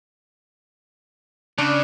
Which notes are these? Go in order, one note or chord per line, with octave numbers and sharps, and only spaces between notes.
C#3 D4